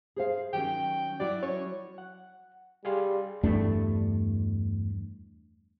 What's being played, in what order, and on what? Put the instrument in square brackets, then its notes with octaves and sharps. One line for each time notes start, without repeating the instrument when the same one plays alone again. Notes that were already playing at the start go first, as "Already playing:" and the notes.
[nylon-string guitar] G#4 C5 F5
[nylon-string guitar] D#3 F#3 C#4 [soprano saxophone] G5
[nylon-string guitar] F#3 E4 F#4 [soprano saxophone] D5
[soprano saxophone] C#5
[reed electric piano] F#5
[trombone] G3 [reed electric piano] G#4 F5 C6
[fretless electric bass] E2 G2 A3 D4